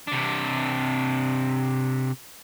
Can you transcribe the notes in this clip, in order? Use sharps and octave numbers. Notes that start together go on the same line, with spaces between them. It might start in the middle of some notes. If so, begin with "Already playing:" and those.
C3 D4